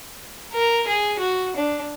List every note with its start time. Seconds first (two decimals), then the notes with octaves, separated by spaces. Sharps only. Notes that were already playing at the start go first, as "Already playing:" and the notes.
0.53 A#4
0.87 G#4
1.19 F#4
1.56 D4